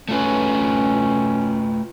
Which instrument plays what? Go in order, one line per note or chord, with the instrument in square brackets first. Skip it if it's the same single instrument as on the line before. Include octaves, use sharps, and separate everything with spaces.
[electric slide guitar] A3 F4 B4 [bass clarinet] C#4